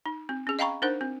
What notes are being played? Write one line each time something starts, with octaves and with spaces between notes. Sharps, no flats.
D#4
C4
C#4 G#4
D#5 F5 G5 A#5 B5 C#6
D4 D#4 A#4 C5 F#5
C4